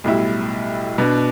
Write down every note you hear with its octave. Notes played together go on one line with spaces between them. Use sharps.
B1 A2 G3 E4
B2 B3 D4